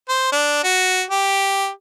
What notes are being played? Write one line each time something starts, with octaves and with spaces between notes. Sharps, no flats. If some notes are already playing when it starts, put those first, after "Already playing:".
C5
D4
F#4
G4